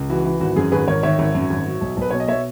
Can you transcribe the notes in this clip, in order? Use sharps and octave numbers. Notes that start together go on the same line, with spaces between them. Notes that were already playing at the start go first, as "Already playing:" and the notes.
Already playing: C#2
E3 F#4
E3
G#1 F#4
F#2 G#4
G#1 G#4 B4
G#1 A#4 C#5
D#3 C#5 E5
G#1
F#2
G#1
F#3
B1
B1 B4
B2 C#5
D#5
B2 C#5 E5